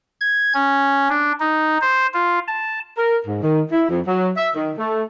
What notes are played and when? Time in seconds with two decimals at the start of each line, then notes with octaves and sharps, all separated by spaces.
0.20 G#6
0.54 C#4
1.09 D4
1.40 D#4
1.81 C5
2.14 F4
2.48 A5
2.97 A#4
3.26 G#2
3.42 D#3
3.71 E4
3.89 F2
4.06 F#3
4.37 E5
4.55 D#3
4.77 A3